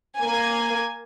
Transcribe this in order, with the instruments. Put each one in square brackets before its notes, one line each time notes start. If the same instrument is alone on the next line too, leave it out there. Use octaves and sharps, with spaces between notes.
[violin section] A#3 G#5